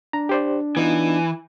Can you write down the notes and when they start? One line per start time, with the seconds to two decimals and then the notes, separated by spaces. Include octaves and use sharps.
0.13 D4 A#5
0.29 G4 C5 D5
0.77 E3 B3 D#4 F4